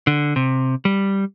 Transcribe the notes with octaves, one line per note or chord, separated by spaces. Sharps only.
D3
C3
G3